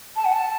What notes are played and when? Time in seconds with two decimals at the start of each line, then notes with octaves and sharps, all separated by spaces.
0.16 A5
0.25 F#5
0.33 A5